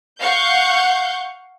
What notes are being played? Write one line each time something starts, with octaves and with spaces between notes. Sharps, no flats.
F5 F#5 C#6 G6